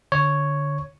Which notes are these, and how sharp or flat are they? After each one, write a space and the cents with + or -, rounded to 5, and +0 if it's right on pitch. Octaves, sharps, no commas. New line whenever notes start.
D3 +0 C#5 +0